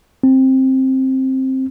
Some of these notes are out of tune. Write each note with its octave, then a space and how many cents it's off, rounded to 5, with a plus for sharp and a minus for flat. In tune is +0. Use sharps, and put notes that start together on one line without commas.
C4 +10